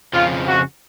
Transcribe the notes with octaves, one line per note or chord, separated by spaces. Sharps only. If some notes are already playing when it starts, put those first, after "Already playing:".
F2 C#3 F3 F4
F#4